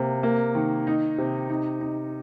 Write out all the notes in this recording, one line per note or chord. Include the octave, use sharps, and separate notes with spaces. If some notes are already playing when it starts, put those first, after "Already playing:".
Already playing: C3 A#3
A#3
D#3
D#4
C3
D#4
D#4